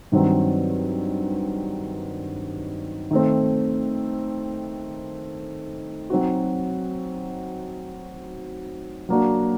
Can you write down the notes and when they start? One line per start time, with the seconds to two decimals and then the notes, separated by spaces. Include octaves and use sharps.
0.12 G2 D#3 F#3 C4
3.11 D#3 A3 C4
6.10 F#3 C4 D#4 F#4
9.09 F#3 A#3 D4 F#4